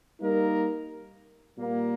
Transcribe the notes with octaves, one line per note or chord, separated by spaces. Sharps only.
G3 A#3 D#4 A#4
A#2 G3 A#3